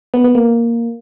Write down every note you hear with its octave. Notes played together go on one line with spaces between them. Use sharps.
B3
B3
A#3